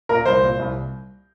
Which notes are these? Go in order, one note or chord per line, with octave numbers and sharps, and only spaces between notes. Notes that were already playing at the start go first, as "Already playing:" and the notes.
A#2 A#4
C2 C5
A#2
C2